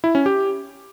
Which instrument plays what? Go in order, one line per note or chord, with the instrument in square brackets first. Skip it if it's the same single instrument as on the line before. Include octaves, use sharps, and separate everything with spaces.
[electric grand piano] E4
C#4
G4